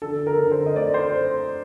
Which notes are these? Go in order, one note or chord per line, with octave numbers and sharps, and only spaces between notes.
D3 A4
A#4
D3
C5
D#5
A3 D5
C5